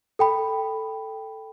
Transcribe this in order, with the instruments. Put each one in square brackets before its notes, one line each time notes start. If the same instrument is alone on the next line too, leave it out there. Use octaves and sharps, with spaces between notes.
[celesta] A4 G5 B5